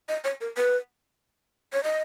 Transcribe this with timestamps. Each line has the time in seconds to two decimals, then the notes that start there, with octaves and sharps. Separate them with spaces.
0.09 D#5
0.24 C#5
0.41 A#4
0.57 B4
1.73 C#5
1.84 D#5